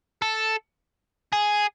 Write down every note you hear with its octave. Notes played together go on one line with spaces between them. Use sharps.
A4
G#4